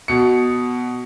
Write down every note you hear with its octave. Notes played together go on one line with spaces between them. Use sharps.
B2 C#7